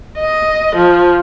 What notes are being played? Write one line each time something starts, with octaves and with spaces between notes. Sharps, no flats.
D#5
F3